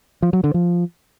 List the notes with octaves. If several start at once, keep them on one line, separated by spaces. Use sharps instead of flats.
F3
F#3
D3
F3